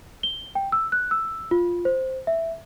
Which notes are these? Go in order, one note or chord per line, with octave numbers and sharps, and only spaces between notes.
G7
G5
E6
F#6
E6
F4
C5
E5